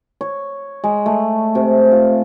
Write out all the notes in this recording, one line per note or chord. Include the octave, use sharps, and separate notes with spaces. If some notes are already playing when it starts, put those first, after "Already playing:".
C#5
G#3
A3
C3
F4